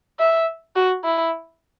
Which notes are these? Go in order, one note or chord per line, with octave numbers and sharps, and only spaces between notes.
E5
F#4
E4